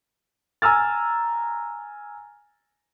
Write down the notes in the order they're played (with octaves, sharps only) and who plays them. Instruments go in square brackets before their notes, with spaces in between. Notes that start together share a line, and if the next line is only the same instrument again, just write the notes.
[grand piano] G#5 A#5 E6 F6 A6